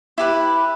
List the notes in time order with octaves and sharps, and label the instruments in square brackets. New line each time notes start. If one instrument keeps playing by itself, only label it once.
[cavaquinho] E4 G4 B4